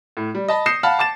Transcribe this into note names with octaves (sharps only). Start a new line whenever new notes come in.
A2
G3
D#5 A5 B5
D#6 G6 A#6 C7 C#7 E7
F5 F#5 A5 B5 F6
A5 D6 A6 E7